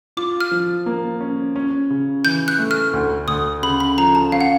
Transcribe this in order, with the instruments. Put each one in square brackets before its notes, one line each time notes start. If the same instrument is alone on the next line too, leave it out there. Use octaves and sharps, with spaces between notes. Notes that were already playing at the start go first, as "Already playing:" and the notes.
[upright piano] F4 [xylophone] D6
[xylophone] F6
[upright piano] F3
A#3
C#4
C#4
C#3
[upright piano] E3 [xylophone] G6
[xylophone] F#6
[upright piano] A3
[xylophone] F6
[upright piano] D2
[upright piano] D2 [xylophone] D#6
[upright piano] C#3 [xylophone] B5
[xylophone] B5
[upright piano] F3 [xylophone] A#5
[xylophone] A5
[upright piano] C#4 [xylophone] F5
[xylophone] F#5